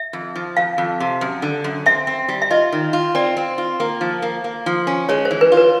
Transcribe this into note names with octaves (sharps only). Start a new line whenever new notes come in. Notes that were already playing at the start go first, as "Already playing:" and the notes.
Already playing: E5
F2
F3
F2 F5
F2
C3
F#2
D3
F#2
C4 E5
C4
G3
E5
F4 D#5
D#3
F4
C4 D5
C4
F4
A#3
F3
A#3
A#3
F3
C#4
G#3 C#5
C5
E3
B4
F4
B4